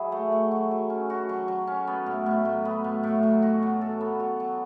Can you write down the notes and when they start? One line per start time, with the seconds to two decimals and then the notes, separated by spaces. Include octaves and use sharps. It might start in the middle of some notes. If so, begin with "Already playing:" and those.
Already playing: F#3 E4 G#4
0.12 A3
0.32 F#4
0.51 F#3
0.71 F#3
0.90 C#4
1.10 F#4
1.29 F#3
1.48 F#3
1.67 C#4
1.87 B3
2.06 A2
2.26 A2
2.45 F#3
2.65 B3
2.84 A2
3.03 A2
3.23 F#3
3.42 F#4
3.62 F#3
3.81 A4
4.01 B3
4.20 F#4
4.40 F#3